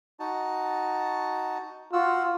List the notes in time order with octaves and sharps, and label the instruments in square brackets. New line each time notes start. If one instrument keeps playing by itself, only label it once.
[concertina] D#4 F#4 A5
[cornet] F4 [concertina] F#4 F#5 E6